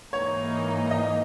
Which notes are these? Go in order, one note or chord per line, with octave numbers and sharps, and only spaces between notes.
G#2 E3 A#3 D#4 C#5
D#5